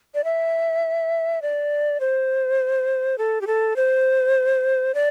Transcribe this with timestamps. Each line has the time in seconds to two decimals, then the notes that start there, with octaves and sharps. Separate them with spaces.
0.15 D5
0.24 E5
1.42 D5
2.00 C5
3.18 A4
3.41 G4
3.47 A4
3.76 C5
4.95 D5